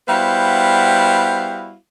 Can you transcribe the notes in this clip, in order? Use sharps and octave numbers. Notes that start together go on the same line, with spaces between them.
G3 B3 E4 F#4 C5 F5